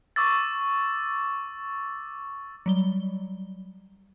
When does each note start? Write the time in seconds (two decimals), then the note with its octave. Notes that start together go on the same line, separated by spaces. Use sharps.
0.16 C#6 D6 E6 A6
2.66 F#3 G3 G7